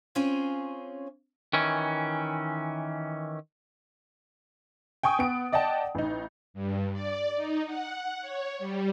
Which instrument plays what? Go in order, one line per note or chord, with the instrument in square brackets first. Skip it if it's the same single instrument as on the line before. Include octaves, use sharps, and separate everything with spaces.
[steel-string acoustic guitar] C4 C#4 F4 G#4 C#5 F5
[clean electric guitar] D#3 E3 C#4
[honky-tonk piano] G5 G#5 C#6 D#6
B3 D7
D5 D#5 F#5 G5 A5
A1 D#4
[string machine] G2
D5
D#4
F#5
C#5
G3